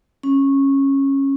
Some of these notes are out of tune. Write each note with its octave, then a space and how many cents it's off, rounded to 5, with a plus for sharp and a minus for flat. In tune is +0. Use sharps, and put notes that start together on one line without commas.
C#4 -15